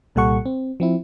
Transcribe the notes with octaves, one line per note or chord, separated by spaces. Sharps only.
C2 A#2 G3 A4 F#5 C#6
C4
F3 C4 E4